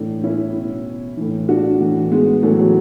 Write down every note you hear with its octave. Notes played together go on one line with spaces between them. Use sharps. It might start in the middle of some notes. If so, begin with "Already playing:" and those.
Already playing: A2 E3 D4
C#4 E4
B2
A2 E3
D4 F#4
A2 E3
G#3 B3
A2 E3 F#3 A3
F#3